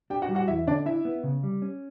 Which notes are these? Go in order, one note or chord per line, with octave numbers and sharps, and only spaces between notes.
D4 G4 G5
F#4 F#5
G3
F#4 F#5
E2 E4 E5
D3 D4 D5
D4 E4 E5
B3
C#3
G3
C#4